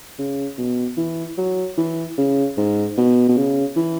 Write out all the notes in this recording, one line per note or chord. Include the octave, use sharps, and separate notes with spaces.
C#3
B2
E3
F#3
E3
C#3
G#2
B2
B2
C#3
E3